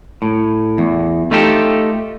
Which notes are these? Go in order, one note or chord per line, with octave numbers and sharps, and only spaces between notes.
A2
E2
A3 D#4 F4 G4 A4